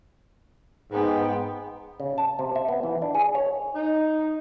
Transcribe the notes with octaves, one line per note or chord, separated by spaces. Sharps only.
G#2 B3 G5
C#3
A5
C3
E5
B3
E3
D4
G#4
C#5
D#4